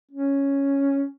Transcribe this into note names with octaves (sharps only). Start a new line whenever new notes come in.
C#4